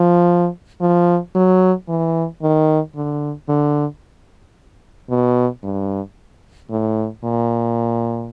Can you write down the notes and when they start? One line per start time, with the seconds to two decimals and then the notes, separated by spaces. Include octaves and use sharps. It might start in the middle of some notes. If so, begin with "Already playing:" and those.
Already playing: F3
0.81 F3
1.35 F#3
1.89 E3
2.42 D#3
2.95 D3
3.49 D3
5.10 B2
5.63 G2
6.70 A2
7.24 A#2